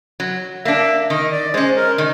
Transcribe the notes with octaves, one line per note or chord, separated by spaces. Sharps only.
F#3
A#3 D4 E5
D#3 D#5
D5
G#3 C#4 C5
A#4
D#3